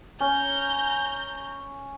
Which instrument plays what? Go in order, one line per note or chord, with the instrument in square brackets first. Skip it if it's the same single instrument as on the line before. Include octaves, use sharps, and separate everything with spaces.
[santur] C#4 [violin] A#5 G6